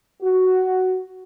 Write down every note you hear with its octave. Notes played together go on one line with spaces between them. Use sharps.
F#4